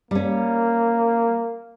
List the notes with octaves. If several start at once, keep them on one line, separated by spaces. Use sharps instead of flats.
G3 A#3 C#4